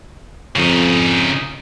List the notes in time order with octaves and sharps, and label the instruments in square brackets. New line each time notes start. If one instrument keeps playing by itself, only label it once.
[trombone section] F2 [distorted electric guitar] C#3 D#4